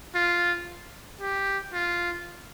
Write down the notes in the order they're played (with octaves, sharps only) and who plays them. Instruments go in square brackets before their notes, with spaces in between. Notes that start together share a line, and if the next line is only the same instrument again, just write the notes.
[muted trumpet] F4
G4
F4